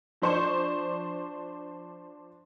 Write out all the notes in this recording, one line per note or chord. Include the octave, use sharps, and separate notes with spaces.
F3 D4 C5 C#6 G6